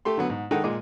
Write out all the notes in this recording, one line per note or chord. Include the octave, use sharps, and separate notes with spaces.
A3 G4 A4 C6
D3 F#3 B3
G#2
D#3 G#3 D#4 A4 F#5 G5
A#2 G#3 D#5 D6